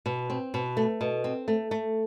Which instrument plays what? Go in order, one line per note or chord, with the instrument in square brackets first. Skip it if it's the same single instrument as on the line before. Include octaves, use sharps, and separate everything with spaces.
[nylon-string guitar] B2
C4
B2
A3
B2
C4
A3
A3